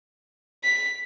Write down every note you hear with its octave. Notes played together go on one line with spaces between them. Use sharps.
B6